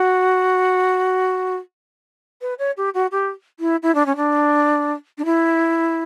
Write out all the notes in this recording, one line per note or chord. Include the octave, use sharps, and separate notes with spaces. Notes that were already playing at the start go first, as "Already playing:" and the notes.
Already playing: F#4
B4
C#5
G4
F#4
G4
E4
E4
D4
C#4
D4
D4
E4